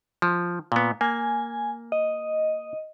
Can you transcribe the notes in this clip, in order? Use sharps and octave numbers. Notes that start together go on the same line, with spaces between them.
F3
A#2 B3
A#3 G#5
D#5